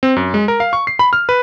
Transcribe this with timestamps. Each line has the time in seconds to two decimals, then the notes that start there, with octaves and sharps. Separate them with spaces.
0.03 C4
0.16 F#2
0.34 G#3
0.48 A#4
0.60 F5
0.73 C#6
0.87 C7
0.99 B5
1.13 F6
1.29 B4